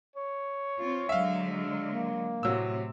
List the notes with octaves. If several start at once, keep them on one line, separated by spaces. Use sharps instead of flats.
C#5
C4 F4
D3 F#3 G#3 E5 F5
A#3
A2 C3 F#3 E6